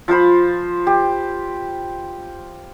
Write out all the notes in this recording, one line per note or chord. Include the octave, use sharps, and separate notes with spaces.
F3 F4 C5 B5
G4